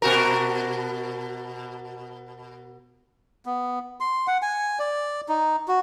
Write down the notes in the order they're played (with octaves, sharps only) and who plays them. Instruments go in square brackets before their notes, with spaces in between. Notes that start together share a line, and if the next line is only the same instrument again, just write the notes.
[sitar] B2 F#4 A#4
[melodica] B3
C6
F#5
G#5
D5
D#4
F#4